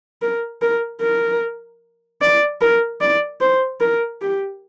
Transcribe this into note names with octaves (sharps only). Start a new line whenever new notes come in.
A#4
A#4
A#4
D5
A#4
D5
C5
A#4
G4